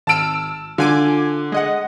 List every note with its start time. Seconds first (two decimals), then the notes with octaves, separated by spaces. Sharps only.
0.07 G#1 A5 E6 F6 D7
0.78 D3 F4 G#5 D6
1.52 G#3 D#5 F#5